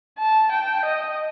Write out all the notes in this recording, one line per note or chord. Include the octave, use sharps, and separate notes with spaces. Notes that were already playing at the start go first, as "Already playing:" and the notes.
A5
G5
D#5